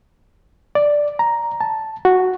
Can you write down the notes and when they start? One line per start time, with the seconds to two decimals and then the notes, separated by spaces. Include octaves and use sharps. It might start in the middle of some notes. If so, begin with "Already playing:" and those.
0.75 D5
1.19 A#5
1.61 A5
2.05 F#4